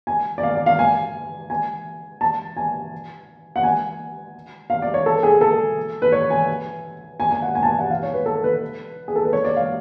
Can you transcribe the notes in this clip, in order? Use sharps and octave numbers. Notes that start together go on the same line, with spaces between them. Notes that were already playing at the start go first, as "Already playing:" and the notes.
G#5
D5
F5
D5
F5
G#5
G#5
A5
G#5
F#5
G#5
F5
D5
C#5
A4
G#4
A4
B4
C#5
G#5
G#5
G#5
F#5
G#5
A5
G#5
F#5
F5
C#5
B4
A4
B4
G#4
A4
B4
C#5
D5
F5